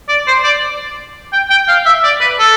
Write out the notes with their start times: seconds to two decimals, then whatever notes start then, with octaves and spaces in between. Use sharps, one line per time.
0.08 D5
0.27 C5
0.44 D5
1.32 G5
1.50 G5
1.68 F5
1.86 E5
2.04 D5
2.21 B4
2.39 A4